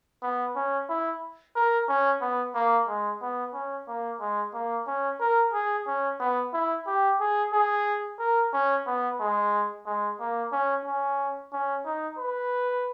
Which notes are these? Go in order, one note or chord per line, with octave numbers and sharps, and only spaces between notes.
B3
C#4
E4
A#4
C#4
B3
A#3
G#3
B3
C#4
A#3
G#3
A#3
C#4
A#4
G#4
C#4
B3
E4
G4
G#4
G#4
A#4
C#4
B3
G#3
G#3
A#3
C#4
C#4
C#4
D#4
B4